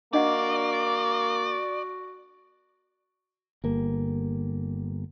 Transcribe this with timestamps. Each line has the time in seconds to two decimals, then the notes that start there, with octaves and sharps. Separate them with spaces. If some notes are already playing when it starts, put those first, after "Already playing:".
0.13 A#3 D4 F#4 D5 D#5 F#5
3.64 G1 A#3